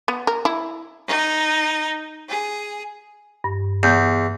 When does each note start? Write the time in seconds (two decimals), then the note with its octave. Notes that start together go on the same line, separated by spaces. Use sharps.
0.08 B3
0.27 A#4
0.45 E4
1.07 D#4
2.29 G#4
3.44 G2
3.83 E2 G6